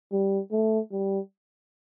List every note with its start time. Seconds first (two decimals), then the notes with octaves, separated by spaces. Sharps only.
0.12 G3
0.51 A3
0.91 G3